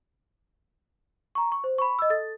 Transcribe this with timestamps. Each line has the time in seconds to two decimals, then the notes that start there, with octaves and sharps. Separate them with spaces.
1.35 A#5 C#6
1.52 C#6
1.64 C5
1.78 B5 C#6
1.99 D#5 E6
2.10 A4 A6